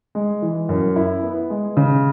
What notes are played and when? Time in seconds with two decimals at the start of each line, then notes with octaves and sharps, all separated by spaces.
0.15 G#3
0.42 E3
0.69 F#2
0.96 E4
1.23 B3
1.50 G#3
1.77 C#3